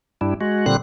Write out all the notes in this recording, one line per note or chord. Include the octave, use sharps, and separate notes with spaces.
G2 G3 D4 E4
G#3 F#4
A#2 D3 G3 C4 F#6